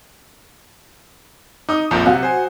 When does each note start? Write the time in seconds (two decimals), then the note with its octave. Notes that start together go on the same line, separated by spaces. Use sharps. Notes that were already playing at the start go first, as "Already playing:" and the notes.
1.69 D#4 D6 D#6
1.91 A#1 F2 A#2 A#5 G6
2.06 C3 F#3 F#5
2.23 C5 G#5